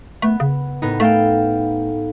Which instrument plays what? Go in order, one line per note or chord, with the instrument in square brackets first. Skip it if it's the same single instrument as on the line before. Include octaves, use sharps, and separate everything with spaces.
[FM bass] A3 [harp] B3
[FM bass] C#3
[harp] A2 B3 D#4
[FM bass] A3 [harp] A4 F5 G5